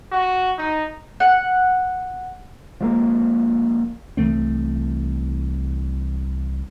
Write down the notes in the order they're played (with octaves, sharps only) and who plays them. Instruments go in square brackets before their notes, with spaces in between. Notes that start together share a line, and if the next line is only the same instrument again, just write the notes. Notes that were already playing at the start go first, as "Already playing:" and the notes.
[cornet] F#4
D#4
[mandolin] F#5
[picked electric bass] F3 G#3 A#3
[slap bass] C2 E3 A3 C4